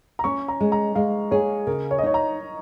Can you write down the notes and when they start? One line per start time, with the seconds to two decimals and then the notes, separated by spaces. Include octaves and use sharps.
0.19 A#5
0.24 C#4 C#6
0.48 A#5
0.60 G#3
0.72 A#5
0.95 G#3 F5
1.31 G#4 C#5
1.67 C#3 A#4
1.91 C#5
1.98 D#5
2.03 D#4 C#5
2.14 A#5